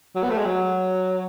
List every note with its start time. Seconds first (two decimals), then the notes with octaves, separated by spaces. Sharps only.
0.15 F#3
0.23 B3
0.30 A3
0.38 G#3
0.45 F#3